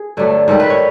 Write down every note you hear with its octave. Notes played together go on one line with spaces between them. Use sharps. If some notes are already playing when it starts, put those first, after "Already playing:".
Already playing: G#4
G2 D3 F#3 A3
G#2 D#3 G3 A4
B4
C#5